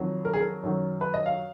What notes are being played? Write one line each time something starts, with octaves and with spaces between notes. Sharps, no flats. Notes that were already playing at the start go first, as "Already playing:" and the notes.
Already playing: F2 D#3 F#3
A#4
G#4
A#4
F#2 D#3 F#3
B4
D#5
F5